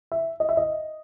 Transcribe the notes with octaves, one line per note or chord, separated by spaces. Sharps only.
E5
D#5
E5
D#5